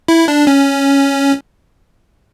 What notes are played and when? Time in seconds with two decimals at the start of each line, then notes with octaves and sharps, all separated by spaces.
0.08 E4
0.28 D4
0.47 C#4